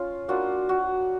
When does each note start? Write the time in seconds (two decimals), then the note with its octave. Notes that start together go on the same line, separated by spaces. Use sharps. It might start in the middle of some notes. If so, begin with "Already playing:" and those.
Already playing: C#4 F4
0.28 A#3 D4 F4 F#4
0.69 F#4